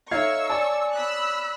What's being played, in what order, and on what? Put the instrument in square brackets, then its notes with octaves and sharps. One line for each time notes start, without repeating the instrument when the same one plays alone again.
[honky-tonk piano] D#4 F5 G#6 [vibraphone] A4 C#5 E5 [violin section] C#6 E6
[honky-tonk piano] C#5 D5 A5 [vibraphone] G#5
[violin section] B5 E6 F#6 [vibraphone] D#6